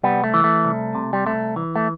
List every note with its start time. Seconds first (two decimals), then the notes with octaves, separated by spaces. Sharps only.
0.03 C2 G3 B3
0.24 A3
0.34 E3
0.44 A3
0.64 C2
0.95 C3
1.13 G3
1.26 C2 A3
1.56 E3
1.76 A3